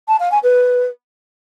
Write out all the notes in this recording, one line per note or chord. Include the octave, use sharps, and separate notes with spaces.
A5
F5
G#5
B4